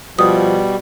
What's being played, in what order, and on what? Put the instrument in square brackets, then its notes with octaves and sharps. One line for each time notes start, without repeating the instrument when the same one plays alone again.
[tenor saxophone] B2 [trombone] F3 [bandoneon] G3 [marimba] D#6